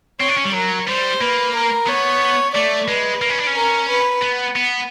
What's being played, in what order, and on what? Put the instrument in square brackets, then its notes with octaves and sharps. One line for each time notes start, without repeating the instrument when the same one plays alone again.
[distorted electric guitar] C4 [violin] C#5
[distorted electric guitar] D4
C#4
G3
[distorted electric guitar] F#3 [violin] A#4
[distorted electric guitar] G3 [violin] C5
[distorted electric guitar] A#3 [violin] B4
[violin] A#4
[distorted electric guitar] B3 [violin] C#5
[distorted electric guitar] A3 [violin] D5
[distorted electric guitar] G#3 [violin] B4
[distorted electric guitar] A#3
C#4
D4
C#4
[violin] A#4
B4
[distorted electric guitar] B3
B3